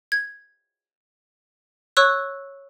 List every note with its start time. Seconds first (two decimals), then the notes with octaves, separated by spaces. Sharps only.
0.12 G#6
1.97 C#5 C#6 E6 F#6